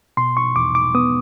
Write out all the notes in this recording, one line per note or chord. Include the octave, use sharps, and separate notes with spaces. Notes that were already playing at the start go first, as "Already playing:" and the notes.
B2 C6
C#6
E2 D6
D6
B3 D#6